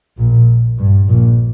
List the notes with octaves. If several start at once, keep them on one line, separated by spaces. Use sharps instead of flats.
A#1 A#2
G2
A#1 A#2